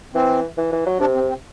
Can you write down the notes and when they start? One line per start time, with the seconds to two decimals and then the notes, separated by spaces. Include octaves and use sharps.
0.15 E3 C4
0.58 E3
0.72 E3
0.86 F#3
1.00 C3 D4
1.15 C4
1.29 C4